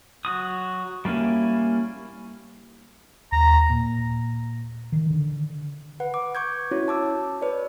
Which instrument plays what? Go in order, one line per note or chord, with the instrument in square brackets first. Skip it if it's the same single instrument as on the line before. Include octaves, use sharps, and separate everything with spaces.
[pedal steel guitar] F#3 F#4 D#6
G3 A#3 C#4 E4
[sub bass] D#2 [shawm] A#5
[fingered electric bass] A#2
D#3
D3
[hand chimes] B4 F#5
D6
C#6 D6 G6 G#6
C#4 E4 F#4 C#5
A5 D6 E6
B4 C#5 D5